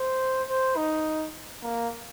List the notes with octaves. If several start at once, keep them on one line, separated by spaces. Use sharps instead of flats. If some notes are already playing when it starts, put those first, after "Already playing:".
Already playing: C5
C5
D#4
A#3